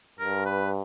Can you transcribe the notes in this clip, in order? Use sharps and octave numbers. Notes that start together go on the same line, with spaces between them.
G2 A#4
B4